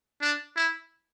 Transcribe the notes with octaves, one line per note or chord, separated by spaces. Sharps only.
D4
E4